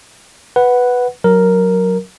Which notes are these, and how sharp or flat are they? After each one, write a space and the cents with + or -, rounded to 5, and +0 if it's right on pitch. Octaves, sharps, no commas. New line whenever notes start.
B4 +0 F#5 +0
F#3 -5 A#4 +0